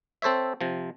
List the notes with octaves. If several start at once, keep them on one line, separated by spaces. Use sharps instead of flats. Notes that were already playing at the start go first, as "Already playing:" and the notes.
C4 A4 C5 C#5 E5
C3 F3